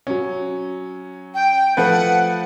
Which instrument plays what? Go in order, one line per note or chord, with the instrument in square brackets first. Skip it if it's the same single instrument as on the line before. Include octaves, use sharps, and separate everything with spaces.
[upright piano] F#3 C#4
[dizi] G5
[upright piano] F3 A3 B4 [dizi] F#5